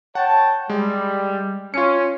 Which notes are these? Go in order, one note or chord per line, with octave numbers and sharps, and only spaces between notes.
C#5 F#5 G5 A5
G3 G#3
C#4 F4 C#7